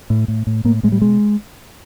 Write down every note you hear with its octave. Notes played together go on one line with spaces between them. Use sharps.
A2
A2
A2
A2 A#3
A2 G#3
G3
B2 G#3